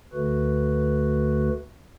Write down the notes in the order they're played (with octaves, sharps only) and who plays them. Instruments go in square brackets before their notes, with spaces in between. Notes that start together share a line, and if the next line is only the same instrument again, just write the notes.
[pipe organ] D2 D3 A3 F#4 B4